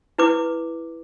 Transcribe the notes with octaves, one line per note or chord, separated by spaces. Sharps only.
E4 B4 D6